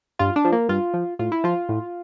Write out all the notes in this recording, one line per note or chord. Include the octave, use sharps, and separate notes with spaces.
G2 F4
D4
F3
A#3
G2 F4
F3
A2 F4
E4
F3 F4
A2